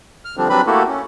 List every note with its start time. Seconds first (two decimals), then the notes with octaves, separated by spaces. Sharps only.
0.25 F6
0.37 D3 F3 G3 C4 D4
0.49 F#3 G3 C4 D4 B4 B5
0.67 A3 A#3 E4 F#4 G4 A4
0.88 C#4